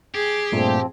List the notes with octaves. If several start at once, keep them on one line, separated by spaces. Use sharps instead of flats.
G4 G#4
G2 A#2 F3 A3 C4